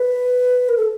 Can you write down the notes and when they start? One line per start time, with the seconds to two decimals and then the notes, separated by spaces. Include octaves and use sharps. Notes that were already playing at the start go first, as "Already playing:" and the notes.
Already playing: B4
0.69 A#4
0.77 A4